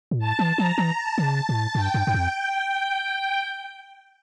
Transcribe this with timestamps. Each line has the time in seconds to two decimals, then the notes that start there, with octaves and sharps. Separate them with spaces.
0.11 A#2
0.19 A2 A5
0.39 E3
0.57 F3 A#5
0.78 E3
0.97 A5
1.18 D3
1.23 C#3
1.49 A2
1.75 G2 G5
1.94 G2
2.07 G2
2.14 F2